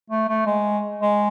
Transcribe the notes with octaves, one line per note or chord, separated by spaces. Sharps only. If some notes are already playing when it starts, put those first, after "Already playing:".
A3
A3
G#3
G#3